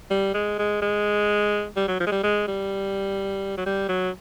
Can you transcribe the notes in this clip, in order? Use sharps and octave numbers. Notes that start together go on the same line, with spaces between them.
G3
G#3
G#3
G#3
G3
F#3
F3
G#3
G3
G#3
G3
F#3
G3
F#3